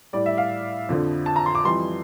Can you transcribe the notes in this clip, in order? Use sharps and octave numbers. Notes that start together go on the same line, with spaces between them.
A2 G3 D5
E5
F5
F2 D3 F3
A5
A#5
C6
D6
F2 E3 G3 C6